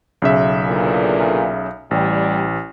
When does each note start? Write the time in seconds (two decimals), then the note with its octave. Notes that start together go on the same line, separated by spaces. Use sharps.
0.22 B1 C#3 E5
0.68 E2 A#2 D3
1.91 A1 G3